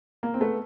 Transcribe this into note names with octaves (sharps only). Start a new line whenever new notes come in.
A#3
C4
A3 B3